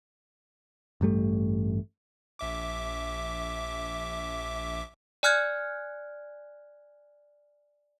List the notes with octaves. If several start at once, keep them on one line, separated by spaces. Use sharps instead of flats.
A1 G2 G3 A3
A#1 E5 D6
D5 G#5 F6 F#6 G#6